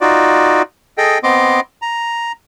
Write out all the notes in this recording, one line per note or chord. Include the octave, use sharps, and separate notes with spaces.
D#4 F4 F#4 D5
G#4 A4 D#5 G5
B3 C4 D#5 C6 D6
A#5